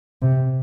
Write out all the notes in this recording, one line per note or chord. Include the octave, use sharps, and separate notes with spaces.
C3